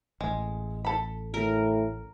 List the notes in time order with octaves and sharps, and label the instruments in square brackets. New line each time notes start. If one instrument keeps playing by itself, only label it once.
[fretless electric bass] A1 [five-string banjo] G#3
[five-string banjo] A4 B5
[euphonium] A2 [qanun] A#4